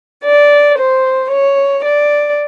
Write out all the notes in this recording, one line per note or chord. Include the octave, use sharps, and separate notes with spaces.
D5
C5
C#5
D5